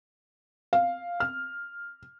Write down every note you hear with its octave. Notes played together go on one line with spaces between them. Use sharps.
F5
F6